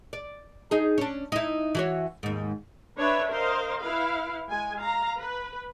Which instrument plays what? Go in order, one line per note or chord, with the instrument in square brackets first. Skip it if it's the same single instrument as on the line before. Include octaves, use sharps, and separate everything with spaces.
[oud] D5
D#4 G#4
C#4 D4
D#4 E4
E3 F#4 C#5
D#2 G#2
[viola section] D4 B4 C#5 E5
A#4 C5 D#5 F5
E4 B4 F5
G#3 G#5
F5 A#5
B4